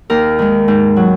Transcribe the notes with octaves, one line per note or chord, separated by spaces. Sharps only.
D#2 A#4
D#3 G#3
G#2
F#3